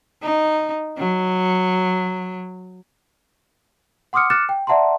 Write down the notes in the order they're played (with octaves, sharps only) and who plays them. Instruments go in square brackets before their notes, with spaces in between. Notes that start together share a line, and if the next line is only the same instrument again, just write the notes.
[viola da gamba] D#4
F#3
[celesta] F#5 C6 D6 D#6 F6 C#7
D6 F6 F#6 A6 C#7 E7
G5
D5 E5 F#5 A5 A#5 C6